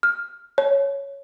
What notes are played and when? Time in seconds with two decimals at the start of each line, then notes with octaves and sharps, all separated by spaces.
0.03 F6
0.58 C#5